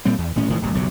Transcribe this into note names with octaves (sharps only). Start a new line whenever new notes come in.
A#2 G3 A#3 C4
E2
D#1 A2 C#4
E1 A2 D#3 F3
D1 G1 D2
F#1 B1 F2 C3